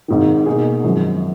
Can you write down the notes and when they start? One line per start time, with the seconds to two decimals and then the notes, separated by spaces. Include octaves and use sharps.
0.08 G#1 G#2 D#3
0.46 B2 A#3 D#4 G#4
0.84 G#1 F#2 F3 G#3